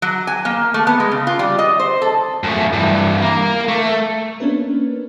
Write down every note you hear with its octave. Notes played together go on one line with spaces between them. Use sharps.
F#3
G#5
A#3
A3
B3
G#3
C#3
F4
G3
D#5
C5
A4
F#2 A3
G2 E3
A#3 A#4
A3
A#3 B3 C#4 D4 A#4 B4